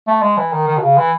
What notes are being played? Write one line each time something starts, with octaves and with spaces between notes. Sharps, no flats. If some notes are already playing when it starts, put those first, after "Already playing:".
A3
G#3
E3
D#3
D#3
B2
C#3
E3